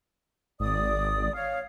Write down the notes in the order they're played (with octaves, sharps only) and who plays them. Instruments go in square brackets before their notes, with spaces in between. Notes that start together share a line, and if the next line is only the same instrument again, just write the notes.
[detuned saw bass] G#1 [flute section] D5 D#6
[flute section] C#5 F5